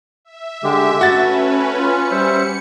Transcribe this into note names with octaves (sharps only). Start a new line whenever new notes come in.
E5
D3 G#3 G4
A3 C#4 F#4 B4 A6
C#4 F4 C#7
G3 C5 E5